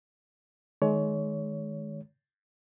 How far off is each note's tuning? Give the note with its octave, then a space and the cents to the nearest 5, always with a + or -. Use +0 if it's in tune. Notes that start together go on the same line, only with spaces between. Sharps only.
D#3 +0 G#3 +30 C#5 +25